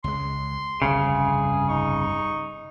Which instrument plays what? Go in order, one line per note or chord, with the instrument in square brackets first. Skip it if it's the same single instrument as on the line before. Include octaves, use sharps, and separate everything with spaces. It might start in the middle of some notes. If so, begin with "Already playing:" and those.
[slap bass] C#2 G#3 [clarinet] C6
[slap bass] G1 C2 F2 [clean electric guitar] C#3 [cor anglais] G#4
[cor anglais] D#4 [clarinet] C#6